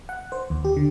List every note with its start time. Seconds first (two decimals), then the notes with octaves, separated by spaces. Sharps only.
0.09 F#5
0.32 C5
0.50 D#2
0.65 G4
0.77 D3